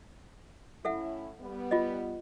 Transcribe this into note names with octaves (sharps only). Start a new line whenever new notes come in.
A2 C#4 E4 A4 E5 F#5
G3 B3
F4 D#5